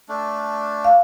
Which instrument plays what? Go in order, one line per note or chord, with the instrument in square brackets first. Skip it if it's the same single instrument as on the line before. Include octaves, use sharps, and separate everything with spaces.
[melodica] A3 D4
[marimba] F5